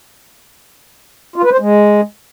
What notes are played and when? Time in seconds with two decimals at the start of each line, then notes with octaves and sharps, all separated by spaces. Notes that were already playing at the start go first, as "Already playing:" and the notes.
1.36 F4
1.44 B4
1.52 C5
1.59 G#3